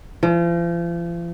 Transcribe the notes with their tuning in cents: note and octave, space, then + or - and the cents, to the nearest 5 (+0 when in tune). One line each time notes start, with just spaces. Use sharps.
F3 -40